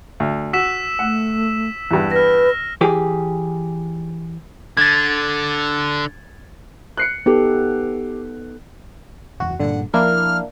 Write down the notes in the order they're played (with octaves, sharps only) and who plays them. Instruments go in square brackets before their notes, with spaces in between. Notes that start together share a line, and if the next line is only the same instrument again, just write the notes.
[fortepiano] D2
[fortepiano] F#4 [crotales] E6 B6 E7
[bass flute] A3 [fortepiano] F#5
[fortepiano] E2 G2
[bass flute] B4 [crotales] F6 A#6
[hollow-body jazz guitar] E3 G4 G#4
[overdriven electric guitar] D3 [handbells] G#6 A6
[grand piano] F#6 C7 C#7
[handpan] B3 D#4 A4 [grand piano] G4
[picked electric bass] F#1 E2 [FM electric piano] F#4
[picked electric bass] G2 A#2 [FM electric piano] D3 [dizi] F#5
[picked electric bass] F3 [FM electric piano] A#3 D4 E4 [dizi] F6